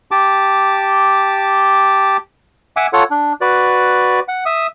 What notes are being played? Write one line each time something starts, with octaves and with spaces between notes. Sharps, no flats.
G4 A5 D6
E5 F#5 G#5 D6
F4 A4 C#5 F#5
D4
F#4 B4 D5
F#5
E5 D#6